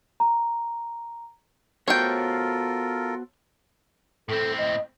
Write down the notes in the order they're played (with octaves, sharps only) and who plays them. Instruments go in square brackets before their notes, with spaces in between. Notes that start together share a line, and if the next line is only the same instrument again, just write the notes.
[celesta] A#5
[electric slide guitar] B3 F#4 C5 [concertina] F4 A4 A#4 [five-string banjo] C#5 G5
[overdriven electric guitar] A2 C4 [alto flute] A4
[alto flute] D#5